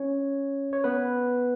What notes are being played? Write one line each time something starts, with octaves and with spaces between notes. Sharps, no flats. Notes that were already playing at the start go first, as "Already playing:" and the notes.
Already playing: C#4 C#5
C#5
B3 B4